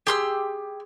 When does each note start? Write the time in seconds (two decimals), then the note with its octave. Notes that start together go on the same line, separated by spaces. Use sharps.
0.07 G4 G#4 C6 E6